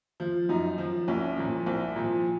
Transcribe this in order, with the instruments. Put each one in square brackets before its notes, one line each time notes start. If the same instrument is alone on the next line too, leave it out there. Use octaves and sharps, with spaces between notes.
[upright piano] F3
F#2 D#4
F3
C2 C#4
A#2 F3
C2 C4
A#2 F3